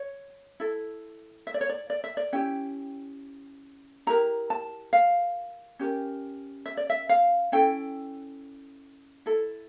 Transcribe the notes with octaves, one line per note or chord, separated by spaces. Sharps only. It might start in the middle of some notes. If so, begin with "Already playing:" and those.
Already playing: C#5
E4 A4
E5
D5
C#5
D5
D5
E5
D5
C#4 E4 G4 G5
E4 G4 A#4 A#5
A5
F5
C#4 G4 A#4
E5
D5
E5
F5
C#4 E4 A4 G5
E4 A4